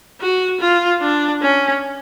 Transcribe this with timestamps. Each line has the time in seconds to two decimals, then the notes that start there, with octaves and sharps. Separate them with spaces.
0.21 F#4
0.60 F4
1.01 D4
1.42 C#4